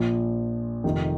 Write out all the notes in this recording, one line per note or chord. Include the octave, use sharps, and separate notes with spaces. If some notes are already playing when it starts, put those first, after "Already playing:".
Already playing: A#1 A#2 F3
F1 F2 C3 D#3